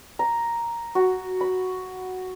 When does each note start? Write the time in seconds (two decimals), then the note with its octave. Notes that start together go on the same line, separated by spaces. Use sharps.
0.19 A#5
0.95 F#4
1.41 B5